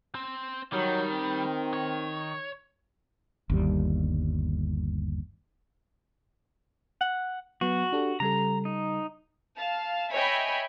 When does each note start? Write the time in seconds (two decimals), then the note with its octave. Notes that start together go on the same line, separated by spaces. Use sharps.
0.15 C4
0.73 D#3 F#3 G3
1.12 C4
1.73 C#5
3.50 G1 D#2 G3
7.01 F#5
7.61 F#3 B3 F#4
7.92 D4 G4 A4
8.20 C#3 G3 A4 A#5
8.65 D#4
9.56 F5 A5
10.13 C#5 D#5 E5 G5 G#5 B5